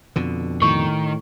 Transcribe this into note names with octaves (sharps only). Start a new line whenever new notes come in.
F2 B2 D3
A2 D#3 C#6